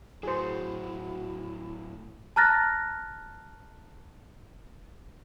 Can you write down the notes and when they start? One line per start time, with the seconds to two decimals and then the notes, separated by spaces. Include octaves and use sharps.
0.23 A2 F#3 E4 F#4 G#4 C5
2.36 A5 A#5 F6 F#6 A6 A#6